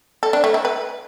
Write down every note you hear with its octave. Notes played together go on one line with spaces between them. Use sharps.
A4
D4
A3
E4
B4